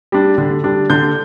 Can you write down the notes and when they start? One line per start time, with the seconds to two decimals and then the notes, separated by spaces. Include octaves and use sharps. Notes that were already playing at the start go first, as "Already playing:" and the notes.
0.12 G3 D4
0.38 D3
0.64 G3 D4
0.90 D3 G6